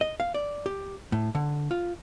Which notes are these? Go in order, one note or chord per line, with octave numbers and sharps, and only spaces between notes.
D#5
F5
D5
G4
A2
D3
F4